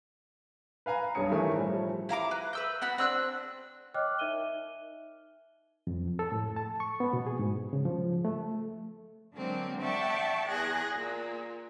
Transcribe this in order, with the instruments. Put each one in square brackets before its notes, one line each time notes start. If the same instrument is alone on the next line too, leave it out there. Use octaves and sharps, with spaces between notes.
[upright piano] B4 F5 G#5 A#5
B1 G2 G3 C#5 D#6 C#7
D#3 E3 A3 G#4 A#4 G#5
A2 F3 G3
[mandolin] E4 F5 A#5 D6
B4
B4 E6 G6
B3 F#4 B5
C4 D4 E6 F#6
[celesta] C#5 D#5 G5 D6 F6 F#6
D#4 A#4 E5 D#7 G7
[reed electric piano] F2
A4
A2
A5
C#6
B3
B2
G#4
G#2
C#3
F3
A3
[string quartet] D3 F#3 G#3 A#3 C4
D5 E5 F#5 G5 A5 C#6
E2 G#4 F#6 G#6 A#6
A#2